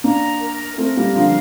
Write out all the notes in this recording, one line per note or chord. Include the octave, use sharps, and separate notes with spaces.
A#3 D4 A#5
A#4
A3 C4 A#4
G3 A#3
D3 F3 F5